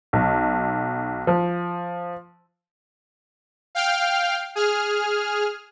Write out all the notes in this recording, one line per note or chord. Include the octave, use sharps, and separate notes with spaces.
B1
F3
F5 G5 F6
G#4 F6